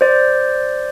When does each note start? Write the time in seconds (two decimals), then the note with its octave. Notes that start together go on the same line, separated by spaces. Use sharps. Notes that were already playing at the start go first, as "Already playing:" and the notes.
0.01 C5 D5